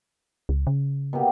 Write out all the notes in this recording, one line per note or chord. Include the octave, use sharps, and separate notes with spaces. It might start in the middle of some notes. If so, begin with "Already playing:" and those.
C#2
C#3
B2 A#3 G4